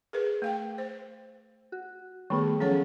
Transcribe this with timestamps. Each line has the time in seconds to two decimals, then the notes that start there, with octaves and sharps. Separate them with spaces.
0.13 G#4 A#4 B4
0.42 A3 F5 G5
0.78 C5
1.72 F#4
2.30 D#3 G3 A3 B3 G#4
2.60 F3 F#3 C#4 G#4 A4 C#5